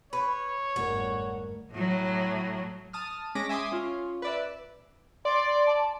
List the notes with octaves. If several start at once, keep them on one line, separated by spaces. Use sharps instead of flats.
B4 C#5
G1 F2 G#2 A3 F#4 A#4
A2 F#3
A5 D#6 F6
G#3 C#4 D6 A#6 B6
E5 G#5 C6 D6 D#6
C#4 F4
B4 D5 E5
D5 C6
A5